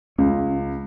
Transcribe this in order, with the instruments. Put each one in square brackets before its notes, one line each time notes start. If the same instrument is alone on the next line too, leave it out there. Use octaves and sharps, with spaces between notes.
[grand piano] C#2 [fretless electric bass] C#4